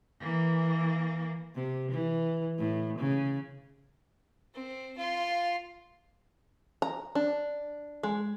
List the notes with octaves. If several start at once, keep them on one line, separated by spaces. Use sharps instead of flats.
E3 A#3
C3
E3
A2
C#3
C4
F4 C6
A#5
D4
G#3